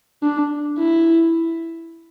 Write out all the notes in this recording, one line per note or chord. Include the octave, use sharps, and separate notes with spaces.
D4
E4